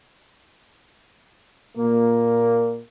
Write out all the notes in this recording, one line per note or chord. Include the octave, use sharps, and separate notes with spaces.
A#2 A#3